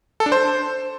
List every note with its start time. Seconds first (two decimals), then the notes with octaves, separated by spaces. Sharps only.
0.20 A4
0.26 D4
0.32 C5